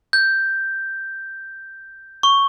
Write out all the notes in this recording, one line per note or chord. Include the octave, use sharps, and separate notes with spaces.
G6
C#6